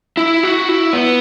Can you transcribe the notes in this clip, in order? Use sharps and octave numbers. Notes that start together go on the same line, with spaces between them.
E4
F#4
E4
B3